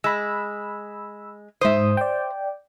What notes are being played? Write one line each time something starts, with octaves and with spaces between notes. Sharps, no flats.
G#3 B5 E6
G#2 C5 E5 D#6
D5 G5